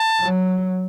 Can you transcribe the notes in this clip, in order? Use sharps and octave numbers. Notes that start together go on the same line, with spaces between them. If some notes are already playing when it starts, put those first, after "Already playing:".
Already playing: A5
F#3